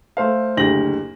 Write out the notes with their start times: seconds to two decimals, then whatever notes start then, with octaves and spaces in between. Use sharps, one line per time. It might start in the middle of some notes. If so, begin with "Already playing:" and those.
0.17 A3 C5 F5
0.57 F#1 D2 G4 A#6 F#7